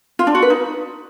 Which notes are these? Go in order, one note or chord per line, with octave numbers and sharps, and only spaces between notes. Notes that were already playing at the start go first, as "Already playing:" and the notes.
F4
D4
F#4
B4
D#4